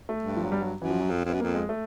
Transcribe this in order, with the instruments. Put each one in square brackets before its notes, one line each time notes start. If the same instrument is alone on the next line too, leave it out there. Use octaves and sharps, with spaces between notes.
[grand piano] A3
[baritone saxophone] G2
[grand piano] F3
F#3
G3
F#3
[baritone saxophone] F#2 [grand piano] E3
[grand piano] F3
F#3
[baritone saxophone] F2
F2
[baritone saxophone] F#2 [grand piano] B3
[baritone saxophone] F2 [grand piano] A#3
[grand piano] G#3
A3